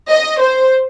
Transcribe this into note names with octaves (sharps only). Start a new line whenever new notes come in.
D#5
C5